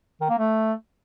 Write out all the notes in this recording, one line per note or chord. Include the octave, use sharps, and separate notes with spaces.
D#3
A#3
A3